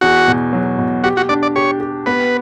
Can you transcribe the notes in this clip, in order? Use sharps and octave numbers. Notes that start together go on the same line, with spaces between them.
E2 F#4
B2
F#3
B2
F#4 G4
F#4
D4 D5
D5
G4 C#5
G4
B3 B4